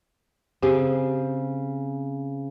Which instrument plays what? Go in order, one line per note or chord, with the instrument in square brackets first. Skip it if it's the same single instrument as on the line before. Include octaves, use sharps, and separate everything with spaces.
[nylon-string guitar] C#3 C4 G#4 [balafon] G4